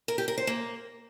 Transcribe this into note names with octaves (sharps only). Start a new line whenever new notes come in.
A#4
G4
A#4
C5
A#3